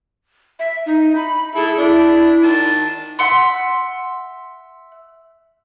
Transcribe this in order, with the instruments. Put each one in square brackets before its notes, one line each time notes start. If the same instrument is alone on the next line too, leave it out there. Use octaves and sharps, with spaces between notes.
[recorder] E5
D#4
B5
[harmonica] E4 A4 [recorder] G#4
[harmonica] D4 [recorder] E4
[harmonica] D#3 A5
[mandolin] E5 F#5 C6